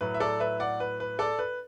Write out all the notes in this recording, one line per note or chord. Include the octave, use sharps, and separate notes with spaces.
A2 F#3 B4
E5
A4 D5
B4 E5
D5 F#5
B4
B4
A4 D5
B4